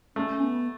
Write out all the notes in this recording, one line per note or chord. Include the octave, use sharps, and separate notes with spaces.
A3 C#4
B3